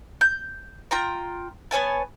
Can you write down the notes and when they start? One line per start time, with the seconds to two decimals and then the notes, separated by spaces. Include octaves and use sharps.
0.21 G6
0.91 F4 G5 A#5
1.71 B3 C#5 G#5 A5